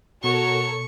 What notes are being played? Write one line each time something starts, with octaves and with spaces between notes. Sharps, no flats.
B2 F#4 A4 A#4 C#5 C#6